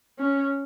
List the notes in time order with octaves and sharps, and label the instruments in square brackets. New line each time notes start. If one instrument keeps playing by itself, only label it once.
[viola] C#4